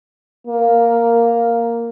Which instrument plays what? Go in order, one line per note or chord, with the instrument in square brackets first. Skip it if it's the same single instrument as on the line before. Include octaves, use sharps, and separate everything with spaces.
[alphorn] A#3